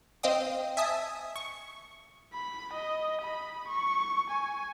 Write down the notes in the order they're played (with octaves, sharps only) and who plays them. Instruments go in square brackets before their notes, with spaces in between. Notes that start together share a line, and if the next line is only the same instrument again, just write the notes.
[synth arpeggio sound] C4 C5 D#5 F5 G5 D#6
E5 G#5 A5 D#6
C#6
[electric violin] B5
D#5
B5
C#6
G#5